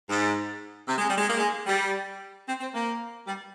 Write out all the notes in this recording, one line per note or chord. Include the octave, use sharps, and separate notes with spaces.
G#2
C3
G#3
G3
G#3
A#3
G#3
G3
C4
C4
A#3
G3